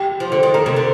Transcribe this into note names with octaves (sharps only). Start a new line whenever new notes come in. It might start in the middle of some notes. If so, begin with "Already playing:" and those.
Already playing: G4
F3
D3
D#3
D#3 A#4
C3
D3